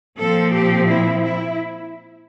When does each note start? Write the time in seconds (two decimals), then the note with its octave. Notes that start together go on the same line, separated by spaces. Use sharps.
0.18 A#2 F3 C4 A4
0.53 G4
0.88 E4
1.23 E4